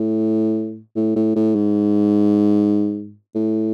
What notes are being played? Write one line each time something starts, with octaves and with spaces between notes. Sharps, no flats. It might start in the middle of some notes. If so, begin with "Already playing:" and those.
Already playing: A2
A2
A2
A2
G#2
A2